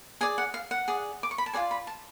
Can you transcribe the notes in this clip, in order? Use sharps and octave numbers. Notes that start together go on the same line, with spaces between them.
G#4 D5 G#5
F#5
F5
F#5
G#4 D5
D6
C#6
B5
A5
F4 G#4 D5 G#5
B5
A5